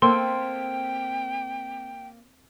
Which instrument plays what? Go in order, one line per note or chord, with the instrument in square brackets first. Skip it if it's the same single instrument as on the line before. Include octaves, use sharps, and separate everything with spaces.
[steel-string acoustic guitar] A#3 [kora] C4 A4 [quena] G5 [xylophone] C6